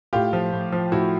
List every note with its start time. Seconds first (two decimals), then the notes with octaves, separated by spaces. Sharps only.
0.13 A2 F4 G4
0.33 F3
0.52 A2
0.72 F3
0.91 A2 E4 F#4